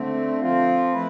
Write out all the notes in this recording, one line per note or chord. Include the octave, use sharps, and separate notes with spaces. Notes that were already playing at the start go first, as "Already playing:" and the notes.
Already playing: D3 A3 C4
F3 C4 F4
A3 E4 B4